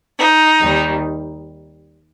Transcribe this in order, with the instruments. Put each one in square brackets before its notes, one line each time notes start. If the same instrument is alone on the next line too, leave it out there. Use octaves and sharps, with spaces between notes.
[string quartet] D#4
D#2 D#3 G3